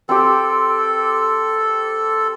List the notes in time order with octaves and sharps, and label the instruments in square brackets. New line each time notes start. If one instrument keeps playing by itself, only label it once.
[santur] C4 G4 [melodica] A4